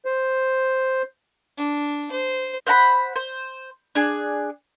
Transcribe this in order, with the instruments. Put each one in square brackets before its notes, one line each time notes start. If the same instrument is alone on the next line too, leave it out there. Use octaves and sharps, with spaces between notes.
[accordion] C5
[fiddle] D4
C5
[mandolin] C5 F#5 A#5 B5
C5
D4 G#4